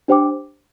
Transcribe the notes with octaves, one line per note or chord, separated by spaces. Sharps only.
D4 G4 C5 G5 D6